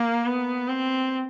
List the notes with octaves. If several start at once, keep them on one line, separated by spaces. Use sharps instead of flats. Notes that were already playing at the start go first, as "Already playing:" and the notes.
Already playing: A#3
B3
C4